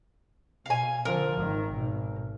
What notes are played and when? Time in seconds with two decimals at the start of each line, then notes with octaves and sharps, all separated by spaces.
0.66 B2 F5 G#5
1.05 D3 F3 A#4
1.36 G#1 D#3
1.71 G#1 B2